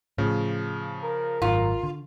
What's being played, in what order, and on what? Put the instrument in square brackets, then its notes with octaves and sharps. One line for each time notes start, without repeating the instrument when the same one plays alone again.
[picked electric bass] A2 [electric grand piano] C#3 F3
[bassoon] A#4
[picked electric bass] G#1 F#2 [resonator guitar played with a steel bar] F4
[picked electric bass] D3